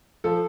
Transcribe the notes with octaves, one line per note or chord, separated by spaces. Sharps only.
F3 A4